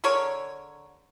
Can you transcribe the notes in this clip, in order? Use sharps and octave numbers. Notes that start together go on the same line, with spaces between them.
D3 G#4 A#4 C#5